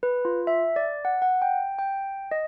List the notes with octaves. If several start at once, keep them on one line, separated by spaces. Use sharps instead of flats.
B4
F4
E5
D5
F#5
F#5
G5
G5
D#5